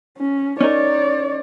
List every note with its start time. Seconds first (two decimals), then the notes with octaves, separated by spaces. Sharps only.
0.18 C#4
0.61 C#4 D#4 A#4 C#5 D5